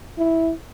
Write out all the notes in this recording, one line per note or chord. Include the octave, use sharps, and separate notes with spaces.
E4